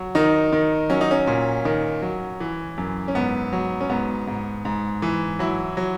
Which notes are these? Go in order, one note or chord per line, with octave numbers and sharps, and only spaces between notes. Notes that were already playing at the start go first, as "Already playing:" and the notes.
Already playing: F#3
D#3 D#4
D#3
F#3 C#4
D#4
C#4
A#2
D#3
F#3
E3
F#2
C#4
G#2 B3
F#3
C#4
G#2 B3
G#2
G#2
E3
F#3 E4
F#3